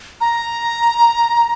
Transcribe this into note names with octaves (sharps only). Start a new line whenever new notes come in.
A#5